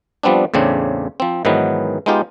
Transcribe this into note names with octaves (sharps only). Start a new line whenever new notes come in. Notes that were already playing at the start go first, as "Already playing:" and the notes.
F3 G3 B3 C4 D4
E2 A2 C#3 C4 D4
F3 C4
G#2 D#3 E3 F#3 B3
G#3 B3 D#4 F4 G4